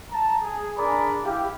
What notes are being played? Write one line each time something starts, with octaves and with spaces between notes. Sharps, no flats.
A5 A#5
G#4
D4 G#4 A#4 D5 A#5 B5
E4 G4 F5